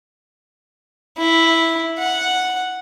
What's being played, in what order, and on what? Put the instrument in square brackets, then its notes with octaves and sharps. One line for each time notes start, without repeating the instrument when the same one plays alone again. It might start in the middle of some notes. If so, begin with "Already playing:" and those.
[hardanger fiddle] E4
F#5